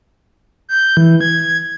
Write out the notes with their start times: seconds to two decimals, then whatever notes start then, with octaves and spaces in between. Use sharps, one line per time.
0.69 G6
0.97 E3
1.21 G#6